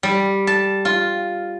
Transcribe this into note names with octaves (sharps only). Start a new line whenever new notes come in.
G3
A5
F4